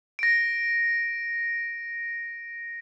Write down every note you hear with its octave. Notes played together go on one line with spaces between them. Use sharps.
A#6 D7